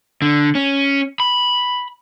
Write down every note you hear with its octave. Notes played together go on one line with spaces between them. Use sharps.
D3
C#4
B5